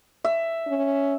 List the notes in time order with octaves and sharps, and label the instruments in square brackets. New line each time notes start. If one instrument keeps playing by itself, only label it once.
[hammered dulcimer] E5
[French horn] C#4